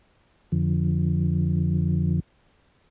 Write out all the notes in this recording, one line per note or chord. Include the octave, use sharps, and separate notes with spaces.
F2 D3 F3